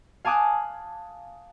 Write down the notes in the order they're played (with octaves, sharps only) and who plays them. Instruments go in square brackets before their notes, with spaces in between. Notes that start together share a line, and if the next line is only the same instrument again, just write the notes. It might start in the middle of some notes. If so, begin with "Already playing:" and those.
[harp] F5 G#5 A5 D6 D#6 F#6